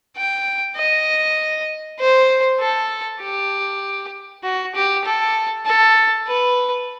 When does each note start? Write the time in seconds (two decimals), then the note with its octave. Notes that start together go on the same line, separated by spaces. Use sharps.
0.17 G5
0.77 D#5
2.00 C5
2.60 A4
3.22 G4
4.43 F#4
4.75 G4
5.05 A4
5.66 A4
6.27 B4